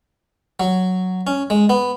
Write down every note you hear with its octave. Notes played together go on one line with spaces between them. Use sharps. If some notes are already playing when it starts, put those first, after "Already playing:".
F#3
C#4
G#3
B3